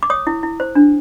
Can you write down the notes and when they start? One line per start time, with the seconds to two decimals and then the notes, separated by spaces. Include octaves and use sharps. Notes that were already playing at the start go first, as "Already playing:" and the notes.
0.03 D6
0.10 C#5 D#6
0.27 E4
0.43 E4
0.60 C5
0.75 D4